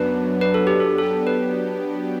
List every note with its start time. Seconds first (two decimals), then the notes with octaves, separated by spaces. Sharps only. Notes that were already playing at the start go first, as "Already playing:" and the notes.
Already playing: F#2 F#3 B3 D4 B4
0.41 B4
0.54 A4
0.67 G4
0.80 A4
0.98 F#3 B3 D4 G4 A4
1.27 B4